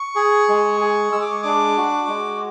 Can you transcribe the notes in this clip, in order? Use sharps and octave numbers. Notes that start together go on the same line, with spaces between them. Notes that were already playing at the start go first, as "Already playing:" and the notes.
Already playing: C#6
G#4
G#3
G#4
G#3 E6
D6
C#6
D4 D6
F#4
G#3